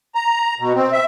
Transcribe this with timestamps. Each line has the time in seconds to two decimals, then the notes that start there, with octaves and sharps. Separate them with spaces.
0.15 A#5
0.59 B2
0.75 C4
0.92 E5